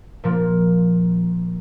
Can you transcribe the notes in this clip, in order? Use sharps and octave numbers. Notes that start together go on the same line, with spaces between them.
A#2 F3 A#3